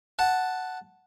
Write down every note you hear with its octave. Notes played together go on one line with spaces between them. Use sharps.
F#5 A5